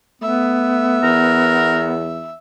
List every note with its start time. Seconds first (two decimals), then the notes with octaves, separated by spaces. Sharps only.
0.22 A3 B3 E5
1.03 E2 A#4